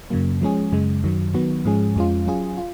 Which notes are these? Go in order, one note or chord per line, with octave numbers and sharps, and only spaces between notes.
F#2 C#3 F#3 A#3
F3 G#3 C#4 G#4
F#2 C#3 G#3
F#2 D#3 F#3
D#3 F#3 B3 F#4
G#2 F3 G#3 C#4 G#4
F2 F3 G#3 C#4 F4
F#3 C#4 F4 G#4
F4